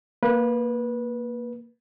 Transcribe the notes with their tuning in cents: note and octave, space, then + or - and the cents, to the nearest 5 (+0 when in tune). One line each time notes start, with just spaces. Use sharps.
A#3 +0 B4 -20